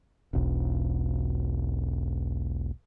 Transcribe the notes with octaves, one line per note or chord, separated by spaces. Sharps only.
E1 B1